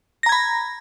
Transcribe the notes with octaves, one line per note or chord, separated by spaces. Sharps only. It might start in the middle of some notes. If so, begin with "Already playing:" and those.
A#5 B5 G#6 A#6